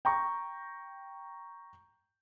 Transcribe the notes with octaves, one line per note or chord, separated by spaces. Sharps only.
G5 A#5 C#6